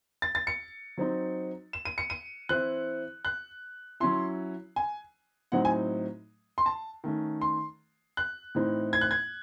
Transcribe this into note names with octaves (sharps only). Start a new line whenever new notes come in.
A6
A6
C#7
F#3 C4 D#4
E7
D#7
C#7
D#7
E3 C4 E4 F#6
F#6
F#3 C#4 E4 C6
G#5
A2 F#3 C4 D#4 F#5
G#5
C6
A5
D#3 A3 C#4
C6
F#6
A2 E3 C4 D#4
G#6
F#6
G#6